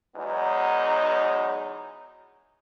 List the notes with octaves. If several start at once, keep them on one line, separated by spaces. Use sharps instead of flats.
E2 F#3 G#3 B3 D#4